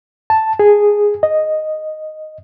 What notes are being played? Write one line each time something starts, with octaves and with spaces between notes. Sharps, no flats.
A5
G#4
D#5